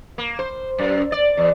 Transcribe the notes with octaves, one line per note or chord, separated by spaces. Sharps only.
A#3
C5
F#2
D5
E2